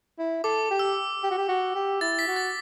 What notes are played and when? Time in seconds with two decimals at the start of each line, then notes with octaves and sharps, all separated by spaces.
0.19 E4
0.44 A4 D6
0.71 G4
0.79 E6
1.23 G4
1.31 F#4
1.38 G4
1.49 F#4
1.75 G4
2.01 E4 A6
2.19 B6
2.28 F#4
2.36 A6